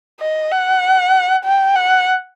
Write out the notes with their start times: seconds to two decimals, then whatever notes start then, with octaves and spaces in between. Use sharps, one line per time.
0.20 D#5
0.52 F#5
1.45 G5
1.76 F#5